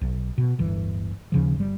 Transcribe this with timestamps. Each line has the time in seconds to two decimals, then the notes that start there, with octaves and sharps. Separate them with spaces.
0.01 B1
0.38 B2
0.58 D1 G1 E3
1.32 D#2 C#3 F3
1.56 G1 G3